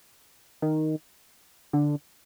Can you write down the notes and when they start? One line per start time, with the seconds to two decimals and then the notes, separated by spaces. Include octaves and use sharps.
0.62 D#3
1.73 D3